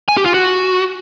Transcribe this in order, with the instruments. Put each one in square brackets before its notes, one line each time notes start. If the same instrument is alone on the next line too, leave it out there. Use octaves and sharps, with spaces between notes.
[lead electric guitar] G#5
G4
F4
F#4